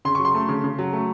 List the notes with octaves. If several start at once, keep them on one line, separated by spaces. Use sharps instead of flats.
C#3 C6
F#3 C#6
C6
A3
C#3
C#3
F#3
A3